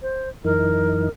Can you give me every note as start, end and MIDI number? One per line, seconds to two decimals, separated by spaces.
0.02 0.29 72
0.45 1.09 42
0.45 1.09 52
0.45 1.09 63
0.45 1.10 70